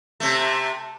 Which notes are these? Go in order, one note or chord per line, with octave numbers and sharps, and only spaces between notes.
C3 A3